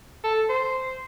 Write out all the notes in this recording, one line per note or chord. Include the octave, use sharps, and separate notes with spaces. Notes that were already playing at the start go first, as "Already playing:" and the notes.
A4
C5